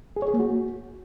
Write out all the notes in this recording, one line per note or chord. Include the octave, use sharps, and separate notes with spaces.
G#4
C#5
G#4
A#3
F#4